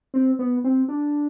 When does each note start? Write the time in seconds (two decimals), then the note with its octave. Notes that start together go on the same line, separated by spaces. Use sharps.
0.14 C4
0.39 B3
0.64 C4
0.88 D4